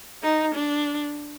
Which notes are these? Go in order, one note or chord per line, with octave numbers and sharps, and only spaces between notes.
D#4
D4